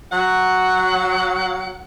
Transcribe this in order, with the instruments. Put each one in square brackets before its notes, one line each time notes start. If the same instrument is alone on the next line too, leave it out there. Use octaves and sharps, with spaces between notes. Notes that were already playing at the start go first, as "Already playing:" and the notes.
[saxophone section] F#3 F#5